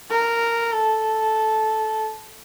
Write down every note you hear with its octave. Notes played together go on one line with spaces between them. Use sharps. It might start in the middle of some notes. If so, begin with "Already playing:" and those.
A#4
A4